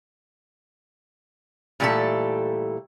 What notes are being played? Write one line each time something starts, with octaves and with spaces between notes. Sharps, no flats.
A#2 E3 G3 A3 G4 A4